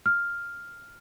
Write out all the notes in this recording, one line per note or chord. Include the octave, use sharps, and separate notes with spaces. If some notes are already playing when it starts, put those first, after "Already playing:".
F6